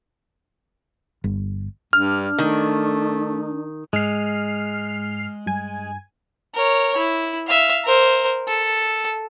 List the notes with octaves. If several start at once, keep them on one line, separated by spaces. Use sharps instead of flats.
G1
G2 D4 F6
D#3 A3
G#2 G#3 F6 C7
G2 G#5
A#4 C#5
E4
E5 F5
A#4 C5
A4